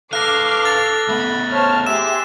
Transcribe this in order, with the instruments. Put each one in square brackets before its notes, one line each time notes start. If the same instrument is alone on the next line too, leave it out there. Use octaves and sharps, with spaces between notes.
[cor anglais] A4 [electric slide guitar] B4 F5 [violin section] D6 F6 C7 [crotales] F#6 A#6
[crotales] A6
[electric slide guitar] A3 B3 [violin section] B5
[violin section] C5 A5 F6 [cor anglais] C#5
[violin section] G4 G#4 C6 [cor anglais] E5 [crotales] E7